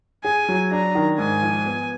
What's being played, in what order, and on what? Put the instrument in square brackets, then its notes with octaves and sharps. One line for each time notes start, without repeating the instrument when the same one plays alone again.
[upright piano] G#4 [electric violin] G#5
[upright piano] F#3
[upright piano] D4 [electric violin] A#5
[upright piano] D#3
[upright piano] G#2 [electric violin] G#5
[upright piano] F3
B3